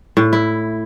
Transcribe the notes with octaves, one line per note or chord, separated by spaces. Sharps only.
A2
E4